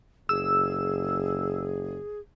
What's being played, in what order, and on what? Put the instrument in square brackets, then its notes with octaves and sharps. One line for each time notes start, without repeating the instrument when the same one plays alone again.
[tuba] F#1 [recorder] G#4 [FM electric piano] E6